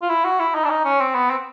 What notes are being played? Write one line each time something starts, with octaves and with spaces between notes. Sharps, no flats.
F4
E4
F#4
E4
D#4
D4
D#4
C#4
C4
B3
C4